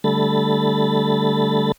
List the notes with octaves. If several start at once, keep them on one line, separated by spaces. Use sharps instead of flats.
D3 G3 A3 A4 B5 A6